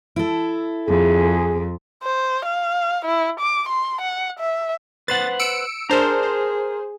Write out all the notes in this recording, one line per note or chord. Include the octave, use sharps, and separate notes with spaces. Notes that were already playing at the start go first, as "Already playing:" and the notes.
E4 A4
F2 G#4
C5
F5
E4
D6
C6
F#5
E5
B4 C5 F#5 A6
E6 C#7 D7
D4 G#4 A#4 C5 A5 A#5
C5